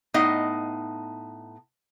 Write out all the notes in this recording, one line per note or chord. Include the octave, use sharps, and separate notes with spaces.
A2 B3 D#4 D#5 F5